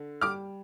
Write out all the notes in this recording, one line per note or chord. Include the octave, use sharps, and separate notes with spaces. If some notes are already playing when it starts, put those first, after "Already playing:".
Already playing: D3
G3 D6 F6